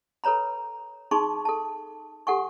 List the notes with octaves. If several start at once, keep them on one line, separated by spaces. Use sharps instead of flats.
A4 B4 C#5 A#5 B5
D#4 G#4 A5 C6 C#6
A4 A5
G4 A4 F#5 G#5 C#6